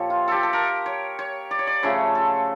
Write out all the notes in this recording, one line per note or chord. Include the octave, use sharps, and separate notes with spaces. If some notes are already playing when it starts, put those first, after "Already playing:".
Already playing: A#2 F3 G4 A4 C#5
F4
G4 A4
A4
A#4
C#5
C#5
D5
C#5
D5
C#3 F3 A3 C#5
A4